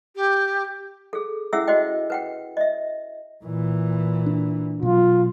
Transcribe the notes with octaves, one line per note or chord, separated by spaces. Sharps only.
G4
G#4 A4
C#4 E4 G#4 E5 F#5 E6
F#4 C5 D#5 G5
B4 F#5 G5
D#5 E5
A#2 E3
D4
B2 F#3 F4